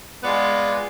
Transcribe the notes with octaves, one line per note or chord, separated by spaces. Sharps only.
G#3 B3 F4 B4 D5